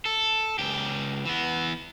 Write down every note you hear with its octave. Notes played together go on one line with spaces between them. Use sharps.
A4
C#2 G4
E3 B3